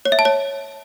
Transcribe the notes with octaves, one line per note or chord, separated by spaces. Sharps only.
C#5
E5
A5
C#5